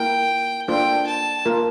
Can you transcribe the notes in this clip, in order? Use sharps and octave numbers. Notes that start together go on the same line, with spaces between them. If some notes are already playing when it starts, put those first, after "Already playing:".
Already playing: A#3 E4 A#4 G5
A#3 D4 F4 A4 C5 G5
A5
A#3 F4 A#4